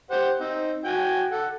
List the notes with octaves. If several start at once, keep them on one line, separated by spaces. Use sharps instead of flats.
G4 C5 F#5
C4 D#4
F#4 G5 G#5
A4 F#5